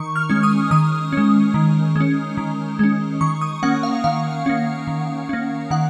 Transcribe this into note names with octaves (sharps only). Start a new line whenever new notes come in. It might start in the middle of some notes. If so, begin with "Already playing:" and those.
Already playing: D#3 C#6
F6
G#3 C#4
D#6
D#3 D#6
G#3 C#4
D#3
G#3 C#4
D#3
G#3 C#4
D#3 C#6
D#6
A#3 C#4 F#5
F5
D#3 F5
A#3 C#4
D#3
A#3 C#4
D#3 F#5